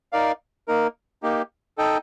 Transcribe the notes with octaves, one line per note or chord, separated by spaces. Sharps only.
D#4 A#4 D5 F5
A#3 D#4 A#4
A#3 D#4 G4
D#4 A4 D#5 G5